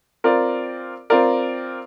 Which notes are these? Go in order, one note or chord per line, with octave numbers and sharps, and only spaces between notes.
C4 F4 A#4 D5
C4 F4 A#4 D5